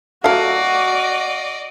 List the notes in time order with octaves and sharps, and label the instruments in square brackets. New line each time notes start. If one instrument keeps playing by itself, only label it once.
[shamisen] F#3 A3 [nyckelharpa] F#4 [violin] D5 D#5 [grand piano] F5